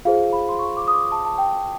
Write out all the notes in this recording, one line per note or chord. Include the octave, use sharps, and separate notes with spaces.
F4 G#4 C5 F5
B5
C6
C#6
D6
D#6
D6
A5
A5
G5